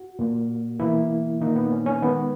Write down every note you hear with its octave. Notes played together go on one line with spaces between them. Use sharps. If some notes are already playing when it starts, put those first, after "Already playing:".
Already playing: F#4
A#2 A#3
B2 E3 A#3 E4
A#2 D#3 A#3 D#4
B3
C#4
C#4
D#3 G#3 B3